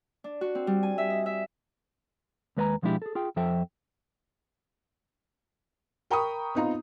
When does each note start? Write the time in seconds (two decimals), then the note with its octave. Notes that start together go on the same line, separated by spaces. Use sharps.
0.24 D4
0.41 F#4
0.55 C4
0.67 G3
0.83 G#5
0.98 E5
1.10 D#5
1.26 E5
2.57 D#2 G#3 B4 D5 G#5 A#5
2.82 B2 F3 G#3 D4 E4 G4
3.02 G#4 A4
3.15 F4 G#4 G5
3.36 F2 F3 A4 E5 G5
6.11 A#4 G5 A#5 B5 C#6 D#6
6.55 B3 C4 D#4 F4 A#5